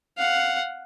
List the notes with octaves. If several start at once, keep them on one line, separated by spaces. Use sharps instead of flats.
F5 F#5